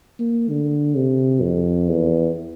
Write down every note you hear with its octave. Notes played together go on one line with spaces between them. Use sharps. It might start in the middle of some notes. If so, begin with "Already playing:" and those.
A#3
D3
C3
F2
E2